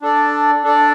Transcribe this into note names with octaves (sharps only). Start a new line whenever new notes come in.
D4 A4 D5
D4 A4 D5